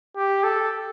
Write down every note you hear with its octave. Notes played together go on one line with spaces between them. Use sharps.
G4
A4